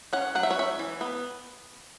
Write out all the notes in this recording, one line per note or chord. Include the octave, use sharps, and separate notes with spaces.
C#4 F#5
F#3 F#5
E5
C#5
C#4 E5
E3
B3